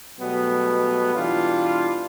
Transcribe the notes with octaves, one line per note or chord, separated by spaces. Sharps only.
B2 F#3 G3 A3 B3
B2 E3 G3 D4 F4